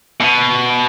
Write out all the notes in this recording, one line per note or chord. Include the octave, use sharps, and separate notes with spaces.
B2